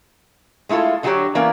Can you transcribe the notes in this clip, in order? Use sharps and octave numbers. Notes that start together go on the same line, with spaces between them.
G#3 A3 E4 F4 A4
D3 F#3 G3 F#4 G4 C#5
E3 A#3 B3 C#4 A#4 D5